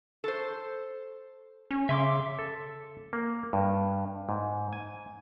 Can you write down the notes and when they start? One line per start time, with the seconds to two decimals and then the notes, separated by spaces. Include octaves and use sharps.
0.24 A4 C5
1.71 C#4
1.89 C#3 E5 C6 D6
2.39 A4
3.13 A#3
3.53 G2
4.29 G#2
4.73 G#5